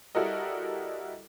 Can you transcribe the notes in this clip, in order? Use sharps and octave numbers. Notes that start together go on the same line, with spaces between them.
G3 E4 F#4 A4 A#4 D#5